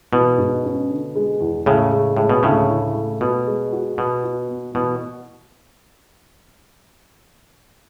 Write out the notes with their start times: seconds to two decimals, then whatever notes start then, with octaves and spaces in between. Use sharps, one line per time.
0.12 B2 E3
0.38 G#2
0.64 C#4
0.89 D3
1.15 G#3
1.40 E2
1.66 A2 C#3 G#3
1.92 G#3
2.17 A2 G#3
2.30 B2
2.43 D2 A2 C#3
2.69 E4
2.95 A3
3.21 B2 F#4
3.47 G#3
3.72 F#4
3.98 B2 B3
4.24 F#4
4.48 B3
4.74 B2 E3